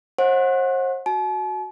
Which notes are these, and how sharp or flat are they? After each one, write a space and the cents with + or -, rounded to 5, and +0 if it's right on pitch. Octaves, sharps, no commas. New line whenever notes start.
C5 +40 D#5 +25 F#5 -25
F#4 +0 A5 -45